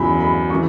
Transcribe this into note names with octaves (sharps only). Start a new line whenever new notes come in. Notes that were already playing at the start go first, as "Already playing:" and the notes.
Already playing: E2 C#3 F#3 B5
B5
C#3 E3 C#6